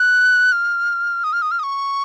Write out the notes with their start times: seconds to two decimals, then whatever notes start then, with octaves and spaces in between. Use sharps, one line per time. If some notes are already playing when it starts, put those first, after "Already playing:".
Already playing: F#6
0.52 F6
1.24 D#6
1.33 F6
1.42 D#6
1.51 F6
1.59 D#6
1.63 C#6